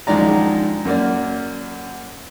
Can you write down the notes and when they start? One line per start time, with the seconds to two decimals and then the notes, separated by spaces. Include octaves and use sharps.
0.07 A#1 F#2 D#3 G#3 D5 A#5
0.85 F#2 A#3 D5